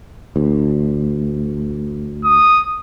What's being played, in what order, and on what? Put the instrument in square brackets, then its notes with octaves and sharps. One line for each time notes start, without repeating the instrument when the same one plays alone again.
[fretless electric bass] D2
[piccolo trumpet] D#6